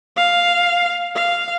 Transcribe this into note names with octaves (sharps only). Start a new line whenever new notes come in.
F5
F5